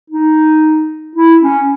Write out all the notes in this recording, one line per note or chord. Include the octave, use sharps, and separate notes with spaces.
D#4
E4
C#4